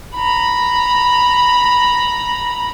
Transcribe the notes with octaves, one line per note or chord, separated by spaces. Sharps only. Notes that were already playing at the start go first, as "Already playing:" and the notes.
A#5 B5